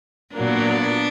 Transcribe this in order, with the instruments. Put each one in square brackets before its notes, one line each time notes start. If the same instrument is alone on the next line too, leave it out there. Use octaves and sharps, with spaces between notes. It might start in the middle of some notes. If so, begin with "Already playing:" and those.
[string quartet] A#2 F#3 A#3 [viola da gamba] B3 D4